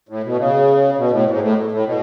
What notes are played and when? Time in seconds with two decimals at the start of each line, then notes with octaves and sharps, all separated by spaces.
0.09 A2
0.24 B2
0.38 C#3
0.98 B2
1.11 A2
1.27 G#2
1.41 A2
1.71 A2
1.85 B2